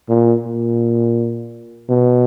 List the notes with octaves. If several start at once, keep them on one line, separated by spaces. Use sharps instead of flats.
A#2
A#2
B2